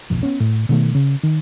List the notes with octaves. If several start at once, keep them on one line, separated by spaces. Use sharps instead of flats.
F#1 B1 F2
B3 C#4
A2
B2 D#3 A3
C#3
D#3